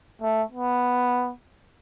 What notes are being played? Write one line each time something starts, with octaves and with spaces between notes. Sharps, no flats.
A3
B3